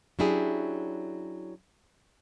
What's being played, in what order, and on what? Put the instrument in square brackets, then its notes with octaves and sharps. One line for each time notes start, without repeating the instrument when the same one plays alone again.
[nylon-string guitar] F#3 C#4 D4 E4 G4 G#4